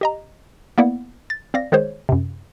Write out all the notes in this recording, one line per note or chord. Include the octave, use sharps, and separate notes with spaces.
G4 D#5 A#5
A#3 B3 E4 D5 F#5
A6
C4 D5 F5 A#6
D#3 G#3 G#4 C5 C#5
F#2 C3